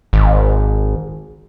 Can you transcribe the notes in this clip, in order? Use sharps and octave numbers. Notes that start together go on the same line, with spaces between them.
G#1